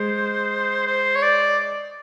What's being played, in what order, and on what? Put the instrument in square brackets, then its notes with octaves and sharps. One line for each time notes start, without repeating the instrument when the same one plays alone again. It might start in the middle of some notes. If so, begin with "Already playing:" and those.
Already playing: [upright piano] G#3 [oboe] C5
[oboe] C5
C#5
D5